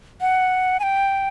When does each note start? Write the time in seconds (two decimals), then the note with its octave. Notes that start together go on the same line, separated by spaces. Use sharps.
0.21 F#5
0.80 G#5
0.83 G5